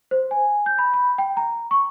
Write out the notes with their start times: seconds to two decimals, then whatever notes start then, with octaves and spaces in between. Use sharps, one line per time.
0.11 C5
0.31 G#5
0.66 G6
0.78 B5
0.94 B5
1.18 G5
1.37 A#5
1.71 C#6